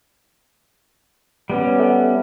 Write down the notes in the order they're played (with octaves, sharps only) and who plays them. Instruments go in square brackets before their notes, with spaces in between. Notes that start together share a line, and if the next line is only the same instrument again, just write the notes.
[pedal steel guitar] G3 B3 C#4
[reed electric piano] A4 E5 F#5